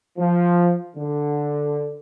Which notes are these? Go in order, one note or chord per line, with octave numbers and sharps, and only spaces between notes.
F3
D3